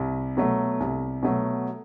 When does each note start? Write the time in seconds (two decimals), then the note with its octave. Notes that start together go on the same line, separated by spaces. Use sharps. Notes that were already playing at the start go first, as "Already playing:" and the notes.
Already playing: C2
0.37 B2 F#3 A3
0.80 C2
1.23 B2 F#3 A3